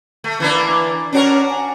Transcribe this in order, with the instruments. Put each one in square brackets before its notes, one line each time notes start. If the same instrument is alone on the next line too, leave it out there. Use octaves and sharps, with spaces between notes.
[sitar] A3
E3 A#3 D4
[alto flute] C#4 [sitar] D4 F#4 A#4
[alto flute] G#5